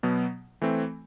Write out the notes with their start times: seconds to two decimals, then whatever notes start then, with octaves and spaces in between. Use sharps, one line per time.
0.03 B2 F#3 B3
0.62 E3 A3 C4